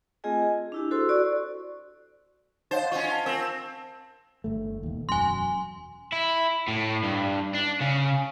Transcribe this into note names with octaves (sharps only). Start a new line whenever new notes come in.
A3 C4 F4 G#4 D#5 G#5
G#4
D4 E4 G4
F#4 A4 C5 C6 E6
F#4 D5 C#6
D#4 C5 C#5 D#5 F5 F#5 A6
C#4 F4 C#6
A5
C4 A#4
G1 A3
E1 D#2
E1 F#2 G#5 C6
E4
A2
G2
D4
C#3